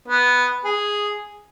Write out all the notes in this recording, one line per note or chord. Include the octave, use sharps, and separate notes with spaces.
B3
G#4